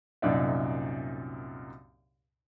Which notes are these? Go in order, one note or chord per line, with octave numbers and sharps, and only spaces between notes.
C2 F#2 A#2 D#4 D5 E5